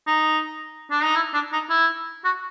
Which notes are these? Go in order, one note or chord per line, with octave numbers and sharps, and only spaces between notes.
D#4
D4
D#4
E4
D4
D#4
E4
F#4